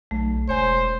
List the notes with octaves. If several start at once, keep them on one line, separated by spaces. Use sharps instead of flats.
B1 A3
E1 C5 C#5 G#5